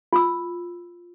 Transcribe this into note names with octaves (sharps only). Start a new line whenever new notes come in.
F4 E6